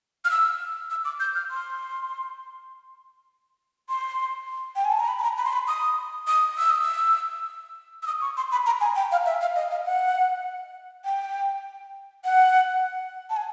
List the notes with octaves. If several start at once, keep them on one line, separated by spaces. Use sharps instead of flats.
F6
E6
E6
D6
G6
F6
C6
C6
G5
G#5
A5
A#5
B5
B5
A#5
B5
C6
B5
D#6
D#6
E6
D#6
E6
E6
D#6
C#6
C6
B5
A#5
G#5
G5
F5
E5
F5
D#5
F5
F#5
G5
F#5
A5
G#5